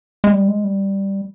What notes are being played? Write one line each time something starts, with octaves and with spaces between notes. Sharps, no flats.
G#3
G3
G#3
G3